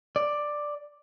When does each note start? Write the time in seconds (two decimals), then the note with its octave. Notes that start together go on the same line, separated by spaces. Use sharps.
0.16 D5